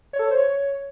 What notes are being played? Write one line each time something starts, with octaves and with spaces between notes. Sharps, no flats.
C#5
A4
C#5
C5
C#5